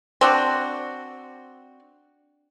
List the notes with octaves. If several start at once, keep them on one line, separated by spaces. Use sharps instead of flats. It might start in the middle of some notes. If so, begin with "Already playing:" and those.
C4 D4 F#4